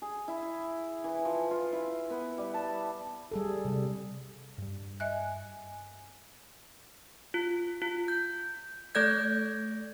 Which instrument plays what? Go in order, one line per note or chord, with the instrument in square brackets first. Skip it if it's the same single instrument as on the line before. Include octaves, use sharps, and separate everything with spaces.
[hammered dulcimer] G#4
E4
E3
F3
F4
E4
B3
G3
A5
[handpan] G3 G#4 A4
C3 G3
[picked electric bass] G2 G3
[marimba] D#5 E5 F#6 [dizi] G#5
[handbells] F4
F4
G6
A3 A4 D5 G6 G#6